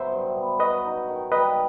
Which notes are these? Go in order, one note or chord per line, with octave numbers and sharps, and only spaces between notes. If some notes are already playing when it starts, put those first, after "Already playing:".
Already playing: F#3 B3 C5 E5
G2
B3
F#4 B4 D#5
D#4
D#3
G3 B4 D#5